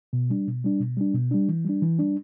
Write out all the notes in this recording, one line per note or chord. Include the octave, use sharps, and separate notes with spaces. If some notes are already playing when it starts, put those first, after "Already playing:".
B2
G3 D4
B2
G3 D4
B2
G3 D4
B2
G3 D4
E3
G3 D4
E3
G3 D4